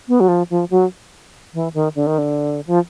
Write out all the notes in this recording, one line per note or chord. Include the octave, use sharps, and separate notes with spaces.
B3
F#3
F3
F3
F#3
E3
D#3
D3
D#3
D3
F3